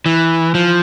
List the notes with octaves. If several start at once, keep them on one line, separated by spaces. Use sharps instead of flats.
E3
F3